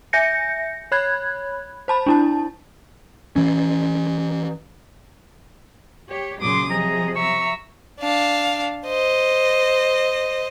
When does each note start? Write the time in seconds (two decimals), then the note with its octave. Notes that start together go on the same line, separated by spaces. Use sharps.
0.13 E5 G#5 G6 A#6 C#7
0.92 C#5 B5 F#6 G#6
1.88 C5 A5 B5
2.06 D4 E4 A5
3.36 E3 C#4
6.09 G4 C#5
6.40 A#2 C#3 F#3 C6 D6 D#6
6.70 C3 F3 F#3 G#4 D#5 A#5
7.16 E5 A#5 C#6 E6
8.00 D4 F5
8.87 C5 D#5